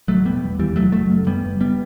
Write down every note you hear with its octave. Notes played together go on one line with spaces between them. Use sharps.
A1 F#3 A3
E1 G3 B3
E2
D#2 E3 G3
E1 F#3 A3
F#1 F#3 A3
F#2
F#2 G3 B3
F#1
G3 B3